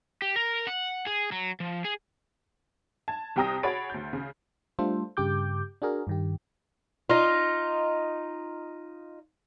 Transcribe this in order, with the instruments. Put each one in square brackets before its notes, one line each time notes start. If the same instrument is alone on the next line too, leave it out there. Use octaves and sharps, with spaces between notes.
[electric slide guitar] G4
A#4
F#5
G#4
F#3
F3
G#4
[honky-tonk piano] A5 G#6
C2 C3 G5 A#5 D#6 A#6
F#4 G#4 C#5 B5 A6 D7
D2 G6
C#3
[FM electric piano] G3 A3 D4 F4 A4 C5
G2 C#3 G4 D6 G6
D4 F#4 G#4 A#4
G2 D#3 G4
[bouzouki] D#4 F4